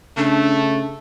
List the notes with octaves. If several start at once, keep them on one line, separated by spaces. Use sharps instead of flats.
C#3 A3 D4